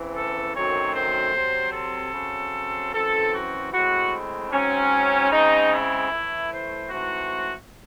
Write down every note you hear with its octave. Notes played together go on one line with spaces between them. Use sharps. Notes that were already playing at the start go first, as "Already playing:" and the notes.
Already playing: C#3 E3 C4
A4
F#2 D#3 F#3 A3 C4 C#5
C5
C3 F#3 C4
A4
C#3 F#3 C4
F#2 E3 C4 A4
F#4
A2 G#3 C4 F#4
G#2 F#3 C4 C#4
C#3 G#3 C4 D#4
E4
A2 E3 A3
C5
G#2 E3 A3 C4 F#4